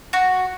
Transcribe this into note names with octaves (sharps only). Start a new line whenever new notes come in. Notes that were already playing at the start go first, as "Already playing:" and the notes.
F#4